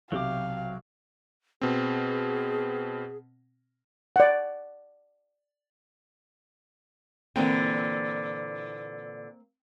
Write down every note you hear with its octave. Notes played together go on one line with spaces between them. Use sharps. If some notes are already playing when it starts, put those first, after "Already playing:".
B1 C3 F#3 G4 F5 D6
B2 C4 G#4
D5 F#5
A#2 D3 E3 A#3 C4 G5